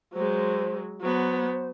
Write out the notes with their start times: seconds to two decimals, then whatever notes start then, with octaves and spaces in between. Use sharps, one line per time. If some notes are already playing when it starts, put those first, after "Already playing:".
0.13 F#3 G#3 C5
1.02 F#3 B3 C5